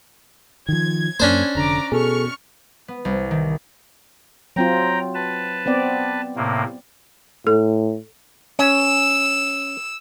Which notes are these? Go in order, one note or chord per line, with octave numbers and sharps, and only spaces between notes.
D#3 F3 G#6
F#2 A#3 C#4 D4 C5
F1 D3 A#5 D6
B2 G#4 A4 C#6 F6
B3
C2
D#3
F#3 C4 F4 G5 A#5
B4 A5
B3 C4 D5
A2 C3 A#3
A2 A4
C#4 E6